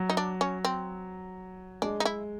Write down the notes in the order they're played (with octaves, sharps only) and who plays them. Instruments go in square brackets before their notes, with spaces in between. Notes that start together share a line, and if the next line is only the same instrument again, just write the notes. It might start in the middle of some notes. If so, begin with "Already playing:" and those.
Already playing: [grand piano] F#3
[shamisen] D#4
D4
C#4
C4
[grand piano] G#3 [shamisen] D4
[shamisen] D#4
E4